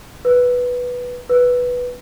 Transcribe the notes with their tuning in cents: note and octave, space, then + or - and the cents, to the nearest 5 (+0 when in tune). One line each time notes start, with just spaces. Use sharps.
B4 -5
B4 -5